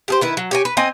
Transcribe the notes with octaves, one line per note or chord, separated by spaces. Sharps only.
G4 G#4 C5
D#3 E4 B4
F#3
G4 C#5 G#5
B4
C4 D#5 G#5